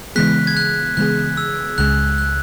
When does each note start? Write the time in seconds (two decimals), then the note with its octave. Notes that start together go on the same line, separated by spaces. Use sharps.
0.15 C#3 E3 G#3 B3 G#4 F#6 B6
0.47 G#6
0.57 F#6
0.97 C#3 E3 G#3 B3 G#4 F#6
1.37 E6
1.78 C#2 C#3 G#3 F#6
2.18 F#6